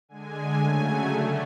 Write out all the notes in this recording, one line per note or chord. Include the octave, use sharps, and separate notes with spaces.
D3 G#3 G#5
C#3 F#3 A3 G#5
D3 A3